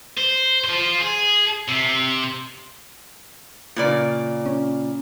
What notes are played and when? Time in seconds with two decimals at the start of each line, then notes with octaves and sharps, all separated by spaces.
0.18 C5
0.64 F4 C5
1.01 G#4
1.68 C3
3.76 A#2 C#3 D5
4.46 C#4